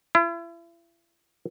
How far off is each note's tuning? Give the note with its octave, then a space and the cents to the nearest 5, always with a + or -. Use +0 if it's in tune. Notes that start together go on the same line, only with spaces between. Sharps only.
E4 +40